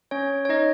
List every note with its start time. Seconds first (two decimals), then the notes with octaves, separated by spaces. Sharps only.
0.11 C#4 C#5
0.45 C#5
0.49 D#4 D#5